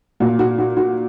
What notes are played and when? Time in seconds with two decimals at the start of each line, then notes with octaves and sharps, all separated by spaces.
0.20 A#2 F#4
0.39 F#4
0.58 F#4
0.77 F#4